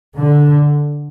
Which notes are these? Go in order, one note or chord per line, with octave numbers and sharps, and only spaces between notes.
D3